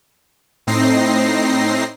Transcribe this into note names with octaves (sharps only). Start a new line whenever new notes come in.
A2 C4 D#4 A#6 C7